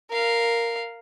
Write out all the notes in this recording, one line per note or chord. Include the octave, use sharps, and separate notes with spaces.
A#4 F5